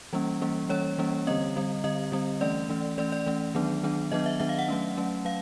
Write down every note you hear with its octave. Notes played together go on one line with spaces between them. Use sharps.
E3 G3 A#3 C#4
E3 G3 A#3 C#4
E3 G3 A#3 C#4 C#5
E3 G3 A#3 C#4
D3 G3 C4 D#5
D3 G3 C4
D3 G3 C4 D#5
D3 G3 C4
E3 A3 C#4 D5
E3 A3 C#4
E3 A3 C#4 D5
D5
E3 A3 C#4
D#3 F#3 B3 D4
D#3 F#3 B3 D4
D#3 F#3 B3 D4 D#5
E5
D#3 F#3 B3 D4 E5
F5
F#5
F#3 A3 C#4
F#3 A3 C#4
F#3 F5